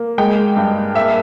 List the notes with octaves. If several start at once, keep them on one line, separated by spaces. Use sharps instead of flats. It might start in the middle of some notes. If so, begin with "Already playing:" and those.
Already playing: A#3
G#3 G5
G2
A#3 E5